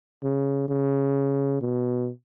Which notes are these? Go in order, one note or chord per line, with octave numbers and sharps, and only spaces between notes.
C#3
C#3
B2